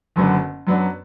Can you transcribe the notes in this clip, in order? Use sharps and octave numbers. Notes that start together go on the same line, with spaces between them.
F#1 F#2 D3 B3
F#2 F#3 B3 D4